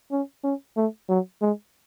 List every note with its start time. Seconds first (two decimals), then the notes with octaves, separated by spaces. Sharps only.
0.11 C#4
0.44 C#4
0.77 A3
1.09 F#3
1.42 G#3